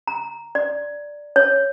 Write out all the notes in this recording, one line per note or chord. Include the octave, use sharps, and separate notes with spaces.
A#5
D5
C#5